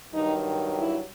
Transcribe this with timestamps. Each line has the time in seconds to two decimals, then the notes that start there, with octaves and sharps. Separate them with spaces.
0.12 G2 D#3 F#3 D#4
0.78 E4